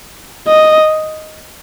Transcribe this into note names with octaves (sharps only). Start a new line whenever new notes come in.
D#5